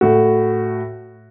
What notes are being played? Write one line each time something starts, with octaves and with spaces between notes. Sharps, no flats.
A2 F#4